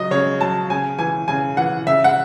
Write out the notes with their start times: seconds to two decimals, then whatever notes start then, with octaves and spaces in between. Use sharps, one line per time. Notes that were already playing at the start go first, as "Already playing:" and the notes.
Already playing: C#3 F#3 D#5
0.11 C#3 C#5
0.40 F#3 A5
0.70 C#3 G#5
0.98 E3 G#5
1.28 C#3 G#5
1.57 E3 F#5
1.86 C#3 E5
2.04 F#5